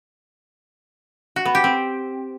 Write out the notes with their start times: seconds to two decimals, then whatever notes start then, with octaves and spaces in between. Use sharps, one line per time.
1.36 F#4
1.45 B3
1.55 G4
1.64 C4